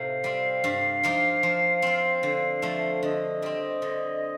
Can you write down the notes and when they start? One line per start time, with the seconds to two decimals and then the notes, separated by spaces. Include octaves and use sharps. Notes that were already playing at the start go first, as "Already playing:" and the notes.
Already playing: A2 C3 A3 D#4 F5
0.24 G3 C4
0.64 G2
1.03 F3 A#3 D#4
1.43 F3
1.82 C4 F4
2.23 D3
2.62 F3 A3
3.03 D3 D#5
3.42 G3 C4
3.82 D3